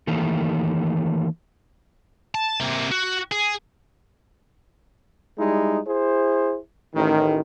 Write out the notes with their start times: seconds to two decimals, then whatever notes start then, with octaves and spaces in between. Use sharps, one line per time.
0.07 D#3 E3 A3 A#3 D#4 G4
2.35 A5
2.60 C3 A#3
2.92 F#4
3.32 G#4
5.39 G3 G#3 D#4 E4
5.88 E4 G#4 C5
6.95 A1 D#3